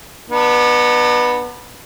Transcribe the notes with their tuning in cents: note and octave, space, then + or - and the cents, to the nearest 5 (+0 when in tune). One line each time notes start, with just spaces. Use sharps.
B3 -15 D4 +45